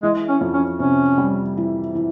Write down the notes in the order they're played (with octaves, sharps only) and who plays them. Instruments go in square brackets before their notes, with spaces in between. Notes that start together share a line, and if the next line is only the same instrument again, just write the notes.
[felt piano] E3 [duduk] G#3
[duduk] C#4
[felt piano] F2
[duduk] C#4
[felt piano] C3 [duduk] C#4
[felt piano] G3
E3
E3